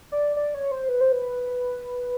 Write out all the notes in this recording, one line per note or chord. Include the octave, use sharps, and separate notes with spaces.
D5
D5
C#5
C5
B4
C5
B4